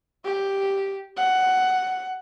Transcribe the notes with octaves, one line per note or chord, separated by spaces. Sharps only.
G4
F#5